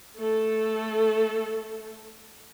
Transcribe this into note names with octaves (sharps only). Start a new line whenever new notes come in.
A3 A4